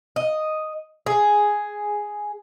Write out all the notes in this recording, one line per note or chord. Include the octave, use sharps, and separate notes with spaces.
D#5
G#4